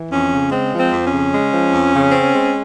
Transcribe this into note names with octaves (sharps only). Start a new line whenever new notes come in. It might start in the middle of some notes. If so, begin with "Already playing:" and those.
Already playing: E3
F2 C#4
C#3
G#3 C4
F3
C4
F2
C#4
C#3
G#3
F3
F2
C#3
C4
G#3